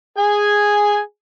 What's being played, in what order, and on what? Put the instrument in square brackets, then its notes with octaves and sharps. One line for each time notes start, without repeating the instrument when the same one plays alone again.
[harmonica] G#4 G#5